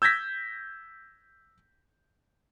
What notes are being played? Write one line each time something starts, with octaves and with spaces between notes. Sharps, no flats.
E6 G6 G#6 A#6 B6